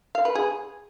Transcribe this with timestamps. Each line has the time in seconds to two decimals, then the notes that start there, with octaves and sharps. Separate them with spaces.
0.15 F5
0.25 B4
0.35 G#4